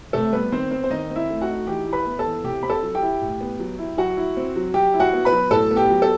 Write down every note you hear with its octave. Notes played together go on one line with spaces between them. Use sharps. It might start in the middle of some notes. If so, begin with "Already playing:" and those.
C3 A3 A4
G3 B3 B4
D#3 C4 C5
B3 C4 C5
C5
D#3 D#4 D#5
C4
E4 E5
A3
F#4 F#5
D#4
E3 G4 G5
E4
B4 B5
B3
A4 A5
E3
C3 G4 G5
C4 B5
A4 A5
F#3
G4 G5
E4
A2
B3
F#3
E4
F#3 F#4 F#5
E4
C4
F#3
F#3 G4 G5
E4
F#4 F#5
B3
B4 B5
F#3
A2 A4 A5
B3
G4 G5
F#3
A4